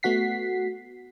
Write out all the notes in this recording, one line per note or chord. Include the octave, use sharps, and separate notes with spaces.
A3 B3 F#4 F#5 B6 C7